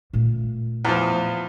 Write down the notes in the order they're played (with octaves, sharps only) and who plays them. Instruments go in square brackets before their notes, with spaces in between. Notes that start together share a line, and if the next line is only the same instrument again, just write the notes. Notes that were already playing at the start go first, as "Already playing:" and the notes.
[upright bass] A#2 A3
[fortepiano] E2 F3